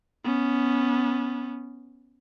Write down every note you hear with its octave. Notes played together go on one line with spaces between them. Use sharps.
B3 C#4